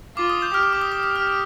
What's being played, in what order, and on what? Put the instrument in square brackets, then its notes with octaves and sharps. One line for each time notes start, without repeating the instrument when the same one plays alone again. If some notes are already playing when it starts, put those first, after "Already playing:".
[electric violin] F4 [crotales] D6
[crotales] D#6
G6
[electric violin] G4 [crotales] F6
[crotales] D#6
D6
D#6
D#6
D#6
F6